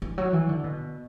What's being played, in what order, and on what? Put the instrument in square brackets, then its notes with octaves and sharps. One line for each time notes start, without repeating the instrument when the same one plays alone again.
[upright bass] E3
F#3
E3
D3
B2